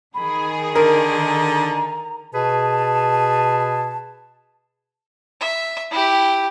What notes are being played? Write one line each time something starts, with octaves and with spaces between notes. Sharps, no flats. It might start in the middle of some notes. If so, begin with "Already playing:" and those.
D#3 G#4 B5
D3 A#4 A#5
B2 G#4 B4 A5
E5
E4 G4